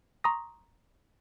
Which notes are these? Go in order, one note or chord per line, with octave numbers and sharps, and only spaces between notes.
A#5 C6 C#6 D#6 A#6